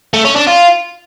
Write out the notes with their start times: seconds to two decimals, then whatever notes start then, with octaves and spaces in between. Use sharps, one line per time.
0.13 A3
0.25 C#4
0.36 D4
0.47 F4